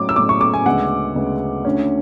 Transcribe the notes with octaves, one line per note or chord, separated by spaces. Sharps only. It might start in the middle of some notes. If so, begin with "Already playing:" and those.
Already playing: A2 F#3 C#4 D6
E6
A2 F#3 C#4 D6
C#6
D6
G#5
D2 C#3 G#3 B3 F#5
D2 C#3 G#3 B3
D2 D3 A3 C#4